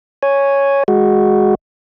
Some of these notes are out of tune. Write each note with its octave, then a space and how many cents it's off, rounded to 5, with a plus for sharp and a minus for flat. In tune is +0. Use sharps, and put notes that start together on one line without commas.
C#5 +0 G#5 +0
G#3 +0 F#4 -5